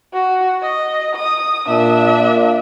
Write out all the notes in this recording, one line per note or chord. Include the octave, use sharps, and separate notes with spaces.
F#4
D#5
D#6
A#2 D4 E5
A#2 A#3 F4